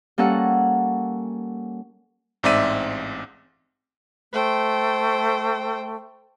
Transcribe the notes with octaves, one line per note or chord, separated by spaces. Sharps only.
G3 A#3 C#4 A4 F#5
A1 G#2 C4 D5 E5 D#7
A3 C5 G5